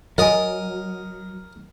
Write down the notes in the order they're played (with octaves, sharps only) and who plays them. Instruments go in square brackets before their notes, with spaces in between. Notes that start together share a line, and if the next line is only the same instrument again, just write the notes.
[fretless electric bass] F#3 [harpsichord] A#4 D#6 [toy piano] D#5 G#5